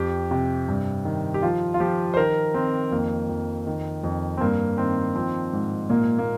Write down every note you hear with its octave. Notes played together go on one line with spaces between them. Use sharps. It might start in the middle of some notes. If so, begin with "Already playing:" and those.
Already playing: F2 G4
C3
G2
D#3
G4
F3 F4
F4
F3 G4
C5
D#3 A#4
D#3 C4
F2 A#3
F2
D#3
F2
C4
G2 A#3
D#3 C4
F3 C4
G#2
A#2 A#3
A#3